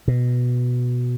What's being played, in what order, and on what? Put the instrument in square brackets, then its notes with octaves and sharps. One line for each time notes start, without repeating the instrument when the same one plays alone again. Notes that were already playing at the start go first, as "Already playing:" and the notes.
[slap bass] B2